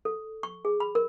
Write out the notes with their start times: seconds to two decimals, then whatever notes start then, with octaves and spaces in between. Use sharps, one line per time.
0.05 A4
0.43 C#6
0.65 G#4
0.80 B5
0.95 A#4